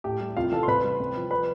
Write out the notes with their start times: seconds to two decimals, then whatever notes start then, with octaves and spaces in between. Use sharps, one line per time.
0.04 A2 G4 G5
0.20 G3
0.37 C2 F4 F5
0.52 E3 A4 A5
0.63 C6
0.68 C3 B4 B5
0.84 G3
1.00 C3
1.16 F3
1.31 B4 B5